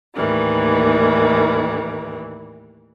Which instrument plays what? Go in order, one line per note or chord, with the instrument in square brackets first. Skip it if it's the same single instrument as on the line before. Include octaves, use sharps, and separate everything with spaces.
[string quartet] D#2 A2 D#3 E3 G3